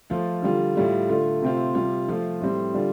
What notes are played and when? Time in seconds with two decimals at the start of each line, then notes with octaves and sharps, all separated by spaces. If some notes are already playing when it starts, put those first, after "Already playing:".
0.10 F3 A3 F4
0.42 D3 G3 F4
0.75 A2 G3 F4
1.09 D3 A3 F4
1.42 C3 A3 C4 F4
1.75 C3 G3 F4
2.08 F3 A3 F4
2.41 A2 G3 C4
2.74 D3 G3 D4 F4